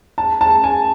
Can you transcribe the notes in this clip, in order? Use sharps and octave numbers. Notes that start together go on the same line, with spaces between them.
A5
A5
G#5